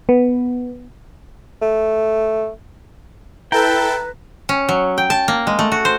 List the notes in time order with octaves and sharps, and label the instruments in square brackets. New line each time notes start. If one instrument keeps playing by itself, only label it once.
[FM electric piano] B3
[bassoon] A3
[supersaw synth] E4 A4 A5 [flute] B4 [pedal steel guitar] G5 [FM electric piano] A#5
[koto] C#4
F#3
G5
A5
A#3
G#3
A3
F#4
C5